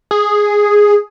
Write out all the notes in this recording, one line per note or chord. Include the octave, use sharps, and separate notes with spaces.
G#4